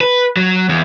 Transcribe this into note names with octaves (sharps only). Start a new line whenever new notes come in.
B4
F#3
E2